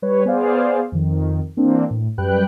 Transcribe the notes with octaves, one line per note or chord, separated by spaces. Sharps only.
G3 B4 C#5
B3 G#4 C5 D5 F5
F2 D#3
E3 A#3 C4 D4
A2
F#2 G3 B4 G5 F#6